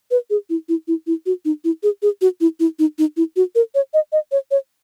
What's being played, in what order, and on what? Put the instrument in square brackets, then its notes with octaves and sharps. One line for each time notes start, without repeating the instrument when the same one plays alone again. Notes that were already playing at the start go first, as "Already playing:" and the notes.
[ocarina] B4
G#4
E4
E4
E4
E4
F#4
D#4
E4
G#4
G#4
F#4
E4
E4
D#4
D#4
E4
F#4
A#4
C#5
D#5
D#5
C#5
C#5